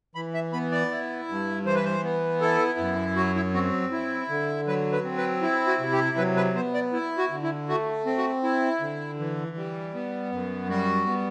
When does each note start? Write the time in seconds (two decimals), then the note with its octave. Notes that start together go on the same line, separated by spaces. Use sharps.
0.15 E3 B5
0.34 E5
0.53 B3 B5
0.72 D5
0.91 E4
1.28 G2
1.65 E3 C5
1.75 B4
1.85 C5
2.04 B3
2.41 E4 A4
2.78 F#2
3.16 F#3 F#4
3.36 E4
3.54 C4 F#4
3.92 E4
4.29 D3
4.67 F#3 B4
4.92 B4
5.04 C4
5.18 B4
5.42 E4
5.67 F#4
5.79 C3
5.92 G4
6.17 F#3 B4
6.36 B4
6.55 B3 C5
6.74 D5
6.93 E4
7.18 F#4
7.31 D3
7.43 E4
7.68 A3 F#4
8.06 C4
8.18 F#4
8.43 E4
8.81 D3
9.19 E3
9.57 G3
9.94 B3
10.31 F#2
10.69 G3 F#4
11.06 B3